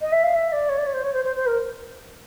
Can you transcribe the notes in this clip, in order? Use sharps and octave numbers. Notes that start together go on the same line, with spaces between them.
D#5
E5
F5
E5
D5
C#5
D5
C#5
C5
C#5
C5
C5
C5
A#4